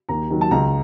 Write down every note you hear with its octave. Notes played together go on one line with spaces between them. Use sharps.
D#2 A#5
D#3 F#3
A5
C#2 A#5